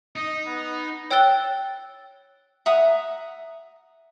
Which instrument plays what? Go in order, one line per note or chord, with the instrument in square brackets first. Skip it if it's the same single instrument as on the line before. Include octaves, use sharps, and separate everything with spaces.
[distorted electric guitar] D#4 [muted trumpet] D#5
[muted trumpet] B3
[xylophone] C#5 G5 E6 F#6 A6 G7
[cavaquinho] E5 F#5 A#5 D#6